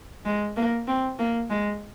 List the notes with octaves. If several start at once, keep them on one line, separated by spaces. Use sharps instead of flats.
G#3
A#3
C4
A#3
G#3